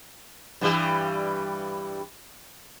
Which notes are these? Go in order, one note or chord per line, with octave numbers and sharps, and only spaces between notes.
G2 E3 G3